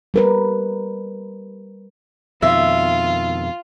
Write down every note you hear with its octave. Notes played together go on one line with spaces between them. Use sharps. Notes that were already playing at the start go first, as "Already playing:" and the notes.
G3 A#4 B4
F2 B2 D#3 F4 E5